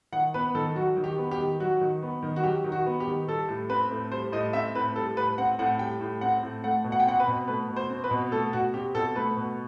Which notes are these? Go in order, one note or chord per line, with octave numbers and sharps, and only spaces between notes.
D#3 F#5
B3 B4
D#3 A4
F#3 F#4
D#3
G4
B3
G4
D#3
F#3 F#4
D#3
B3
D#3
F#4
F#3 G4
D#3
F#4
B3
G4
D#3
G3 A4
A2
C4 B4
A2
G3 C5
A2 D#5
C4 E5
A2 B4
G3 A4
A2 B4
C4 F#5
A2 F#5
G3 G5
A2
C4 F#5
A2
A3 F#5
B2
F#5
G5
C4 F#5
B4
B2
A3 B4
B2
C5
C4
B4
B2
A3 A4
B2 F#4
C4 G4
B2 A4
A3 B4
B2